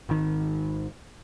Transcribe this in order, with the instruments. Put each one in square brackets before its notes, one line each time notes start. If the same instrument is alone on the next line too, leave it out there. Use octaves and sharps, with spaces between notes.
[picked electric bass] G#1 D#3